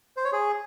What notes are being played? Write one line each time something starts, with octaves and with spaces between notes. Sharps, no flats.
C5
C#5
G#4